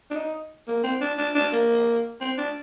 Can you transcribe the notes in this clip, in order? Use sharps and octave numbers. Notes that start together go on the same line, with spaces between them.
D4
D#4
A#3
C4
D4
D4
D4
A#3
C4
D4